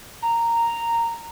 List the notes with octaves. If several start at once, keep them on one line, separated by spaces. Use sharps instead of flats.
A#5